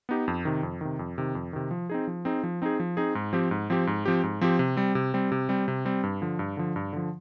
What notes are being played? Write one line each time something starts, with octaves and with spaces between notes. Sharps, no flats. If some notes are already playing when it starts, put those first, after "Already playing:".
B3 D#4 G4
F2
C3 D#3
F2
C3 D#3
F2
C3 D#3
F2
C3 D#3
F3
C4 D#4 G#4
F3
C4 D#4 G#4
F3
C4 D#4 G#4
F3
C4 D#4 G#4
G#2
F3 C4 G4
G#2
F3 C4 G4
G#2
F3 C4 G4
G#2
F3 C4 G4
C3
G3 C4
C3
G3 C4
C3
G3 C4
C3
G3 C4
G2
D3 F3
G2
D3 F3
G2
D3 F3